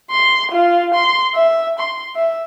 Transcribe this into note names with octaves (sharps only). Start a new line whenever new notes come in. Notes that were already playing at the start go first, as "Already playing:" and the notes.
C6
F4
C6
E5
C6
E5